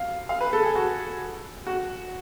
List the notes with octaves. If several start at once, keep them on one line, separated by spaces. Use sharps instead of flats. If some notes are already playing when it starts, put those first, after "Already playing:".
Already playing: F5
F5
B4
A4
G#4
F#4
F#4